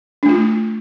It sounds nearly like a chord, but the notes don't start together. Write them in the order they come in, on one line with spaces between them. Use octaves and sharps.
D4 A3 F4